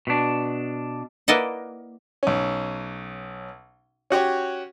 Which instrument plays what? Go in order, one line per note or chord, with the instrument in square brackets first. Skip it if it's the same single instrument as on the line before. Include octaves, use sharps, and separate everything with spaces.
[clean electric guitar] B2 D4
[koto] A#3 E4 B4 D5 D#5 F#5
[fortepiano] B1 C#4
C#4 F#4 G4 C#5